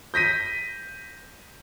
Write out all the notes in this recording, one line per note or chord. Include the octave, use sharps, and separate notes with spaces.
G6 A#6 B6 D#7